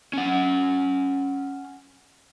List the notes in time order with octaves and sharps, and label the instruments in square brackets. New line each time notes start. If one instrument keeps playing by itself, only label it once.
[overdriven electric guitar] C#4 F#5